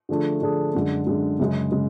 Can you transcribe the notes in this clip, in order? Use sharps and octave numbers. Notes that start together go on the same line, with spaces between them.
D3 F3 A3 D4 G#4
D3 F3 A3 D4 G#4
F#2 D3 G#3
F#2 D3 G#3
F#2 C#3 G#3
C#3 G#3